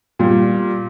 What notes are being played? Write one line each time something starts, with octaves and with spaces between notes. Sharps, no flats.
A#2 G3